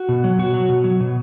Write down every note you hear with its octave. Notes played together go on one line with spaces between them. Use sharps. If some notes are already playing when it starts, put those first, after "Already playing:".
Already playing: F#4
B2
F#3
B2 F#4
F#3
B2
F#3
B2